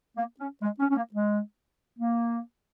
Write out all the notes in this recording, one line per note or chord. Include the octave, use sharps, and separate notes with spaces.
A#3
C#4
G#3
C#4
C#4
A#3
G#3
A#3